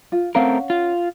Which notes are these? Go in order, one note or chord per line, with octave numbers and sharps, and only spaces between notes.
F4
A3 C4 C#4 A#4 F5 F#5
F4